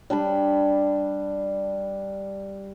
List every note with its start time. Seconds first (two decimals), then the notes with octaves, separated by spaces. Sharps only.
0.10 G3 D4 A5 B5